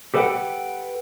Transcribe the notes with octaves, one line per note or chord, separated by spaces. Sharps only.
G4 A4 B4 E5 F#5 G5